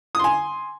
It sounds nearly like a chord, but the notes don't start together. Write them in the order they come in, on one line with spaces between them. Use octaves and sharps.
D#6 C6 G#5